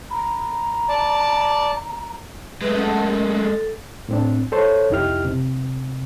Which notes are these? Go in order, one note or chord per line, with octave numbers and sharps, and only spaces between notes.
A#5 B5
D5 A5
G#3 A3 B4
C#4 A4 F#5 A5
A#4
A4
A2 C4 D4
A4 C5 C#5
C2 F2 D#4 E4 G4 F6
C3